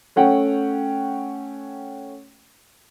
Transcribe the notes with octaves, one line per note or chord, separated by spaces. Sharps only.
A3 C#4 F#5 G5